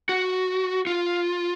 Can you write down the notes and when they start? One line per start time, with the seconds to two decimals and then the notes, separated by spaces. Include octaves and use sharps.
0.09 F#4
0.87 F4